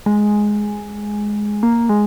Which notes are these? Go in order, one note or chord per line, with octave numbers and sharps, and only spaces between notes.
G#3
A#3
G#3